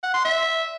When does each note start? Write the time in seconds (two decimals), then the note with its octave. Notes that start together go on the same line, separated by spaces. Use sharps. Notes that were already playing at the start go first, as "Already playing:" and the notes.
0.03 F#5
0.14 C6
0.25 E5